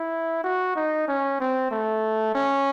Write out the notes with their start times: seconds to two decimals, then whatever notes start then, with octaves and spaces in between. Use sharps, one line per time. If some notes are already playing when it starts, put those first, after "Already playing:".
Already playing: E4
0.44 F#4
0.76 D#4
1.08 C#4
1.40 C4
1.71 A3
2.35 C#4